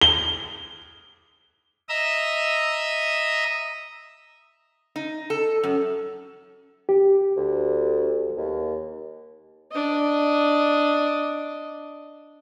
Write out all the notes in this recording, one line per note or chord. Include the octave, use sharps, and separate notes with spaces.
G7
D#5 E5 A#5 D#6 E6
D#4
A4
F#2
G4
D2
D#2
D4 D#5